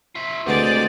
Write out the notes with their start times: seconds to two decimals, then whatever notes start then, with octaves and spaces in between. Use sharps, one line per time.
0.15 F4 E5
0.46 D2 G#3 C4 G4 B4 D5 F#5